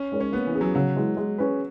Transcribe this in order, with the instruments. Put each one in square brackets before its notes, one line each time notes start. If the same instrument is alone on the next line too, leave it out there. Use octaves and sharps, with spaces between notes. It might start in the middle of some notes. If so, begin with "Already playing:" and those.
Already playing: [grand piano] C#4
[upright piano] G#3 D#4 A#4 C#5
[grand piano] C#4
[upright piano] A#3 [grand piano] B3
[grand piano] E3
[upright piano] C#4 G#4
[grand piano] F#3
[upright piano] C#3 [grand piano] F#3
[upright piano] E3 G#3
G#3
C#4 G#4 B4